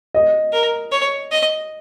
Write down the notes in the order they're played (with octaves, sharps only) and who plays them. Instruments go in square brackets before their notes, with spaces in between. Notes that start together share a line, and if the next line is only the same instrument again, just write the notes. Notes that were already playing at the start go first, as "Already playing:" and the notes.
[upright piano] D#5
[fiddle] A#4
C#5
D#5